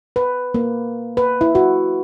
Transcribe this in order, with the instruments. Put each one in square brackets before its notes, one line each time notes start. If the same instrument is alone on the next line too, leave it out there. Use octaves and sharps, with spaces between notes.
[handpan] B4
A#3
B4
E4
F#4